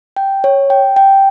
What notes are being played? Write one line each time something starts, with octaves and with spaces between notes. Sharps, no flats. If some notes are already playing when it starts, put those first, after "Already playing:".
G5
C#5
G5
G5